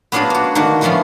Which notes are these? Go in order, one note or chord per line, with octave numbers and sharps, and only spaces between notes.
B3 C#4 D4 F4 F#4 G#4
A#3 F#4
D3 D#3 A#3 F#4
E3 F3 A3 B3 C#4 F4